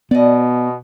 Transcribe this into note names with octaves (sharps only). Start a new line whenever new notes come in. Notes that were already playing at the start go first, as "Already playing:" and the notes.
B2 B3 D5 D#5